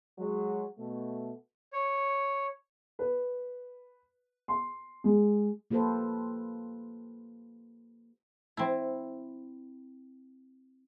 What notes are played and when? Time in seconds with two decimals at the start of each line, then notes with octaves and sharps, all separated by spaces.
0.17 F#3 G#3
0.78 B2 A3
1.73 C#5
2.99 B4
4.48 C6
5.04 G#3
5.71 A#3 F4 G4 A4 B4 C5
8.57 C4 E4